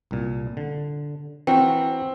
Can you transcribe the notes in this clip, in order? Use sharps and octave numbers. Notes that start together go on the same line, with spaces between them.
C2 A#2
D3
E3 C4 F#4 A#4 G5